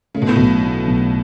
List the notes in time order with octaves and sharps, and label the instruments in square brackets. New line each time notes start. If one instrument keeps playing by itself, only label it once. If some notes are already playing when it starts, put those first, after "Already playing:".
[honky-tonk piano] C#3 [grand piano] A3
[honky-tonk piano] B2
A2
[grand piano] B1 [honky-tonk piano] B2
[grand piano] A3
B1